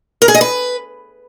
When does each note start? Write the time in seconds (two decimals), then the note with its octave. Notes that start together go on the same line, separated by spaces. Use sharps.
0.22 A#4
0.28 G#4
0.34 D#5
0.41 B4